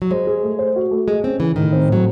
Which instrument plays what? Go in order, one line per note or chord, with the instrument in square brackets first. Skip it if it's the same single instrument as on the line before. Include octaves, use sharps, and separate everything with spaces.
[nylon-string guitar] F#3
[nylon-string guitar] G#3 [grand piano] C5
[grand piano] G#4
A3
C5
F#4
A3
[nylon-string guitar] G#3 [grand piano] G#4
[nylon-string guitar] C4 [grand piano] C#4
[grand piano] C#3 [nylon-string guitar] E3
[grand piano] A2 [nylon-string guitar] D#3
[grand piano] C4
[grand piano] A2 [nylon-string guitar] F#3